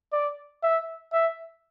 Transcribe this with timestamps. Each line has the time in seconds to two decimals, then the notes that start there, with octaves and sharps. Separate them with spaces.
0.13 D5
0.63 E5
1.13 E5